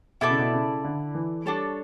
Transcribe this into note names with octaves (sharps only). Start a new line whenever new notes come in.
B2 E4 A4 D5 A5
C#3
B2
C#3
D3
E3
G3 D4 A4 C#5